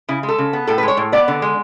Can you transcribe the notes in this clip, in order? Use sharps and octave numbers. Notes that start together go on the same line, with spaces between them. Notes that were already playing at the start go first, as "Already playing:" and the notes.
C#3 E4
G#3
A4
C#3
B3
A2 A4
B4
G#3
C#5
A2
B3 D5
D3
G#3